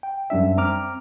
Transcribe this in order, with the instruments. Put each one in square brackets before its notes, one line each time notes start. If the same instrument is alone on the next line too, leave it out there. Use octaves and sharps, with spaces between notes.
[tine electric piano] G5
F#2 G3 D4 E5
C4 A#5 D6 F6